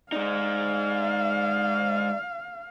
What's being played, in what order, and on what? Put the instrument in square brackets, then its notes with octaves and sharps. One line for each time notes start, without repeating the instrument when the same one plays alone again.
[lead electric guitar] G#3 D#4 [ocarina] D5 [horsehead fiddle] F5